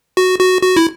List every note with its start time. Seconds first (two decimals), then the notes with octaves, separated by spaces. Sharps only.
0.17 F#4
0.39 F#4
0.62 F#4
0.76 E4